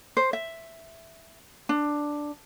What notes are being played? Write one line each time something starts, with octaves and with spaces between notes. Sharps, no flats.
C5
E5
D4